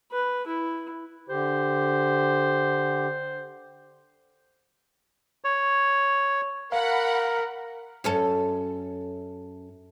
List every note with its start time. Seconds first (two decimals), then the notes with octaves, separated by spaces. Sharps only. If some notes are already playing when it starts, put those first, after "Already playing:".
0.12 B4
0.47 E4
1.29 D3 G4 C5
5.44 C#5
6.72 A#4 F5 F#5 B5
8.04 F#2 C#4 A4